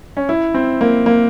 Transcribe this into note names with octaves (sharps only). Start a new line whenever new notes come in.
C#4
E4
C4
A#3
A#3